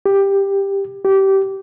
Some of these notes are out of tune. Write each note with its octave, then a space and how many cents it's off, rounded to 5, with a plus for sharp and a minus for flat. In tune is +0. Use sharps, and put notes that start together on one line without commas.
G4 +10
G4 -20